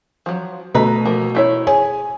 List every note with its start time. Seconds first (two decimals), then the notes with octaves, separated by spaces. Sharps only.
0.26 F3 F#3
0.75 B2 A3 B4 D#5 A#5
1.06 F3 A#3 A#4
1.35 A3 E4 C#5
1.67 G#4 C#5 G#5